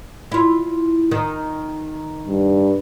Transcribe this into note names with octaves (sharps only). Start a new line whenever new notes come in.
E4 F4
D#3
G2